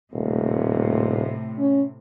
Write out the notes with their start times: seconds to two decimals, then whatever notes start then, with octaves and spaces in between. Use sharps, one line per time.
0.13 D#1 A2 C3
1.59 C#4